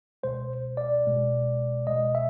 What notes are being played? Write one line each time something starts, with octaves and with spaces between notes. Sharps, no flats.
C#2 B2 G#3 C5
D5
C#2 B2 G#3
C#2 B2 G#3 D#5
E5